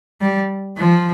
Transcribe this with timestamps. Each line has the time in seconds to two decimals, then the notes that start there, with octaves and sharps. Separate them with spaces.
0.21 G3
0.78 F3